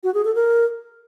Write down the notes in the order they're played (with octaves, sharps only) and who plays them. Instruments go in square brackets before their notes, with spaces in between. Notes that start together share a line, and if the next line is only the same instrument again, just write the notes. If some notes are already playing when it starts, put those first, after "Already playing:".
[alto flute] F#4
G#4
A4
A#4